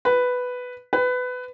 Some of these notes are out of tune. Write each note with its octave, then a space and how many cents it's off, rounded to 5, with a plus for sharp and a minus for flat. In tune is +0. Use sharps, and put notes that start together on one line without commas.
B4 +5
B4 +20